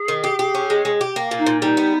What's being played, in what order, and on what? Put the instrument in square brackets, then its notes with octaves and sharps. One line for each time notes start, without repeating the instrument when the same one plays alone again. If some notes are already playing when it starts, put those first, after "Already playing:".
Already playing: [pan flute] G#4
[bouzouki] D#3
G4
G4
C#4
G#3
G#3
G4
A#3
A#2
[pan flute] D#4
[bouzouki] A#2
[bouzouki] G3 [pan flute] D#4
[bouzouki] B3